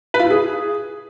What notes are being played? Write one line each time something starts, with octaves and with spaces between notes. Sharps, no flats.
B4
F4
E4
G#4